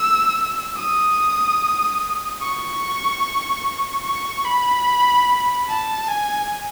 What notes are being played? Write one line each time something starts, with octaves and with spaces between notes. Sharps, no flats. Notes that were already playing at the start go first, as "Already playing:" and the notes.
Already playing: E6
D#6
C#6
C#6
B5
A5
G#5